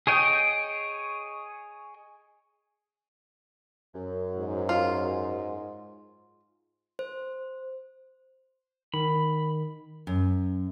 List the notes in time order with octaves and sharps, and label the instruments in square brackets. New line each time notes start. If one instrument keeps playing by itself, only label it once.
[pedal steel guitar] G#4 C#5 D#5 G5
[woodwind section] F#2
[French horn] G#2
[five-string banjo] F4
[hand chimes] C5
[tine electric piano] D#3 [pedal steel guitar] B5
[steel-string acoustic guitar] F#2